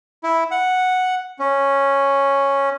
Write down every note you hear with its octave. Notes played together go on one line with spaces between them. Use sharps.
E4
F#5
C#4